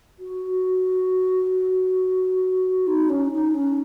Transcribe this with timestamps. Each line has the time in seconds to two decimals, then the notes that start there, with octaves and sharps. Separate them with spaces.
0.19 F#4
2.87 D#4
3.09 C#4
3.32 D#4
3.54 C#4